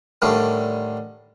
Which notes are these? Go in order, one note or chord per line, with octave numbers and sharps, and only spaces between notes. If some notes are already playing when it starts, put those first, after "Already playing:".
A2 D3 D#3 G3